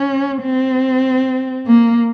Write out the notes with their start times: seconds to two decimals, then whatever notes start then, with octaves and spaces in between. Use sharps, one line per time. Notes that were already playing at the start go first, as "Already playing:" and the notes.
Already playing: C#4
0.42 C4
1.67 A#3